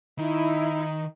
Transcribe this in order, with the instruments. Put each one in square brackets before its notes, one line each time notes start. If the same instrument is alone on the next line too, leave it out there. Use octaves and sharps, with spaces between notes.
[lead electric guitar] D#3 [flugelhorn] D#4 [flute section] E4